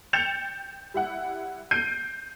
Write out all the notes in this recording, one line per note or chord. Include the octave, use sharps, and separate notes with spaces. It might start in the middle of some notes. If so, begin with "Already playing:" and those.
G5 G6 A6 C#7 E7 F7
G3 E4 F#5
G6 C7 D7 D#7